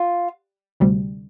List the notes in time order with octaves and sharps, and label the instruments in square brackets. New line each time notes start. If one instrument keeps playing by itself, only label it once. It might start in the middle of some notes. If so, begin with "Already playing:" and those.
Already playing: [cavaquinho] F4
[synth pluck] D2 C3 G3